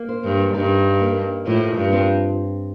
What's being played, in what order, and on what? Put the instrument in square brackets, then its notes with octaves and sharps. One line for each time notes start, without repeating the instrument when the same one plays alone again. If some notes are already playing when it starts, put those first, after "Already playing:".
Already playing: [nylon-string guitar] A#3
C5
[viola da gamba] G2
[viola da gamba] G2 [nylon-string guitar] D#4
[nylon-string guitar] A#3
[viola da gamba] A2 [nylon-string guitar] F3
[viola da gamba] G2
[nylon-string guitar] C4